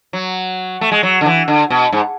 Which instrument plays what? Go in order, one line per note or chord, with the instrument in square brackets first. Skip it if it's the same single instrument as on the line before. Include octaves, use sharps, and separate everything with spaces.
[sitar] F#3
A3
G#3
F#3
D3
E3
D3
B2
G#2